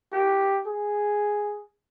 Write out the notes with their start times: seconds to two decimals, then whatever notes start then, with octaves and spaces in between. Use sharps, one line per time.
0.13 G4
0.66 G#4